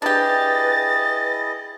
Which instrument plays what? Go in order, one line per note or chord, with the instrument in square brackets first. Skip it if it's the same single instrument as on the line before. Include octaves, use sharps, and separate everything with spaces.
[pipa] D4 G4 [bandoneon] E4 G#4 D#5 [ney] B4 [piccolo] A6